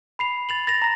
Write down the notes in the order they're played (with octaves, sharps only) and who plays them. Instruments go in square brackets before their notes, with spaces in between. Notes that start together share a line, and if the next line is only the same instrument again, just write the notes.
[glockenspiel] B5 C7 F7
A6 F7 F#7
A6 A#6 F7
A#5 A#6